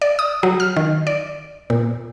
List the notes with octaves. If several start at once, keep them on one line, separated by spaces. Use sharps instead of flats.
D5
D#6
F#3
F6
D#3
D5
A#2